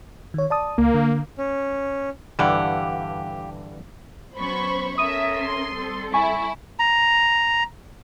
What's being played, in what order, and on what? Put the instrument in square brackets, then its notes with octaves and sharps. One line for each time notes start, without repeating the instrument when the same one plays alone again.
[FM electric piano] D#3 C#5
D5 A5 D#6
[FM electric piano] C#2 [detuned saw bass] A#3
[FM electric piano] D3
[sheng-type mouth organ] C#4
[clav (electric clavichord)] G2 D3 E3 [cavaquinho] G4 F5 F#5
[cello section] F#3 B3 C#4 [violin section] C5 B5 C#6
[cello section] C#4 A4 A#4 [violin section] E5 [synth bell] D#6 D#7
[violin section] C6
[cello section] G3 C4 A4
[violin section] E4 [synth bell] G#5 C#6
[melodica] A#5